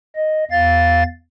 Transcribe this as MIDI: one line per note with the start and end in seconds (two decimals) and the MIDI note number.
0.16 0.44 75
0.51 1.03 40
0.51 1.03 77
0.51 1.03 93